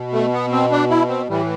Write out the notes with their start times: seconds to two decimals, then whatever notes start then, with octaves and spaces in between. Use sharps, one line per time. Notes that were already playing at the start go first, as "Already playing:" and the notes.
Already playing: B2
0.13 A3
0.33 B3
0.52 C4
0.71 D4
0.90 E4
1.09 C4
1.29 A2 E3 G3